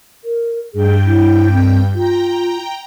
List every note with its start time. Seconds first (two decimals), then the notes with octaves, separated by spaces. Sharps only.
0.24 A#4
0.73 G2 G#4 G5
1.06 E4
1.52 C4
1.95 F4 G5 A#5